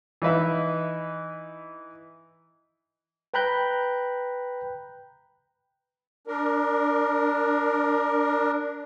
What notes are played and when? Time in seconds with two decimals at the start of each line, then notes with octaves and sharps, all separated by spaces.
0.22 E3 D#4 B4 E5
3.34 B4 G5 A#5 B5 F#6 G6
6.27 D4 A#4